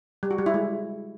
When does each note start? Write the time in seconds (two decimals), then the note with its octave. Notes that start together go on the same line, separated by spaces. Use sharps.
0.23 G3
0.31 F#4
0.38 G3
0.46 E4
0.54 G#3